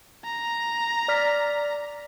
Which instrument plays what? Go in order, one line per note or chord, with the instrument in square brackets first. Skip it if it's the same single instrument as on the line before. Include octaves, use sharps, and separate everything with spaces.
[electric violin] A#5
[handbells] D5 F6 B6